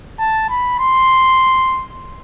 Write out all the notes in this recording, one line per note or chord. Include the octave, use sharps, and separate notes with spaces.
A5
B5
C6